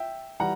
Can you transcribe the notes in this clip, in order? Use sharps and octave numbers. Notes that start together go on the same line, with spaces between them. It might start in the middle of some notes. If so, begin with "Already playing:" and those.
Already playing: E5 G5
E3 G3 F#5 A#5